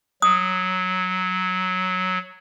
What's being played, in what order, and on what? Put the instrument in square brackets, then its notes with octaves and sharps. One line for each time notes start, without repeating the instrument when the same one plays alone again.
[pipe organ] F#3 [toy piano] D#6